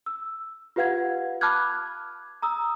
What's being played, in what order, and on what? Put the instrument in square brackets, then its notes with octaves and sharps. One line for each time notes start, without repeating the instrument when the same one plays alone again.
[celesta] E6
F4 G4 B4 F5 F#5 G#6
A5 B5 D6 F6 F#6 G#6
A#5 D#6 E6